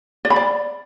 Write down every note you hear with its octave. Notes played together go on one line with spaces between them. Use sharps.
D5
B5
D5